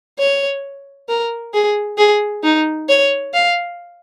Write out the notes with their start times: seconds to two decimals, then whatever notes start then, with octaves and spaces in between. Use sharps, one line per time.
0.19 C#5
1.09 A#4
1.54 G#4
1.98 G#4
2.44 D#4
2.89 C#5
3.34 F5